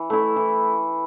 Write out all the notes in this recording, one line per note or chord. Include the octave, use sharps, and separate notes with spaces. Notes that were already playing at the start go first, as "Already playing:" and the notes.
Already playing: E3
A3 E4
E3